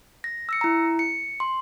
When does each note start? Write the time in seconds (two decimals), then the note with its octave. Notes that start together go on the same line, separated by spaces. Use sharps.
0.24 A#6
0.49 E6 A#6 C#7
0.61 E4 A#5
0.99 C#7
1.40 C6